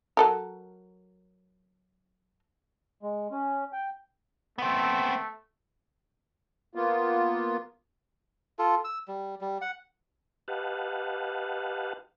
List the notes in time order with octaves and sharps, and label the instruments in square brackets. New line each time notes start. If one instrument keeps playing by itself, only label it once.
[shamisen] F#3 A4 A#4
[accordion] G#3
C#4
G5
[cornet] A3 [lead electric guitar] B3 C4
[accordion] A#3 B3 F4
[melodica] F4 A4
E6
G3
G3
F#5
[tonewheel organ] G4 B4 D#5 F5 F#5 A5